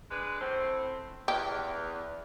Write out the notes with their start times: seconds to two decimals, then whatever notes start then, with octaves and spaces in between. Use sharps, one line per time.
0.11 G#3 D4 B4
0.41 A2 C4
1.28 E2 G4